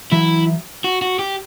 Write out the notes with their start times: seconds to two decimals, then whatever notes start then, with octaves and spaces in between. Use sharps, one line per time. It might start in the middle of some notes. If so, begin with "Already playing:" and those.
0.12 E3 F#3 E4
0.84 F#4
1.02 F#4
1.19 G4